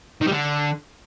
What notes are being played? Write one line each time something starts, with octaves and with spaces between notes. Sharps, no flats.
D#3
G3
D3